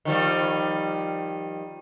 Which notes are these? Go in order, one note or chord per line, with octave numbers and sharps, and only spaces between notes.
D#3 F3 G3